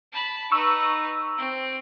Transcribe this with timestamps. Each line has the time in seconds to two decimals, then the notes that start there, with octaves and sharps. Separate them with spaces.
0.12 A5 B5
0.52 D#4 B4 C#6 E6
1.38 C4